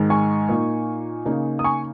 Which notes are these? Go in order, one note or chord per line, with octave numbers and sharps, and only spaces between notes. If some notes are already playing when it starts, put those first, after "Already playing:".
Already playing: G#2 D#3 G#3 D#4
G#5 C#6
A#2 A#3 D#4
C#3 A#3 D#4
D#6
G#5 C#6